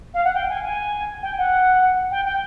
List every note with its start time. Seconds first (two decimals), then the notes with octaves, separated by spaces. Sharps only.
0.14 F5
0.24 F#5
0.34 G5
0.49 G#5
0.63 G#5
1.22 G5
1.38 F#5
2.11 G5
2.25 G5